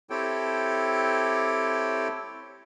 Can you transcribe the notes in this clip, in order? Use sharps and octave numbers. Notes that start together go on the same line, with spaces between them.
C4 E4 G4 A4 C#5 G5